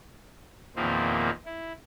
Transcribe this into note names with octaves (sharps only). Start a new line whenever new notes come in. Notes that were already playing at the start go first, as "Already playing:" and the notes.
E2 A#2 D#3 F3 A#3 C4
E4